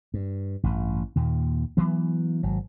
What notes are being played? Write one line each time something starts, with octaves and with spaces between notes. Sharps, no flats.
G2
A1 G2
D#2 A#2
E3 F#3 B3
G#1 F#3